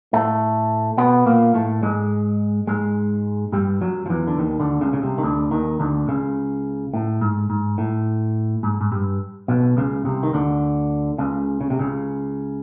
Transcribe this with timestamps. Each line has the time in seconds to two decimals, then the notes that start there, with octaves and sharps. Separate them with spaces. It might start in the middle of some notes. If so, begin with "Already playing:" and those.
0.13 A2 A3
0.98 B2 B3
1.26 A#2 A#3
1.54 A2 A3
1.83 G#2 G#3
2.67 G#2 G#3
3.52 G2 G3
3.81 F#2 F#3
4.06 F3
4.10 E2 E3
4.28 D3
4.38 D#2 D#3
4.60 D2 D3
4.81 C#2 C#3
4.93 C#3
5.02 C2 C3
5.18 D#3
5.23 D2 D3
5.51 D#2 D#3
5.80 D2 D3
6.08 C#2 C#3
6.94 A2
7.21 G#2
7.50 G#2
7.78 A2
8.63 G#2
8.81 G#2
8.92 G2
9.48 B1 B2
9.77 C#2 C#3
10.05 C2 C3
10.23 D#3
10.33 D2 D3
11.18 C#2 C#3
11.61 C#3
11.70 C3
11.79 C#2 C#3